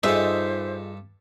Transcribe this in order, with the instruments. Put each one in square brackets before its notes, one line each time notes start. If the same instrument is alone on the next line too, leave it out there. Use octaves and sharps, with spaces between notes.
[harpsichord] G2 A4 [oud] D#4 F4 G#4 [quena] C5 [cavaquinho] E5